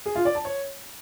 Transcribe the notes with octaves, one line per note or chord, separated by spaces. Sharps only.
G#4
F4
D5
A5
C#5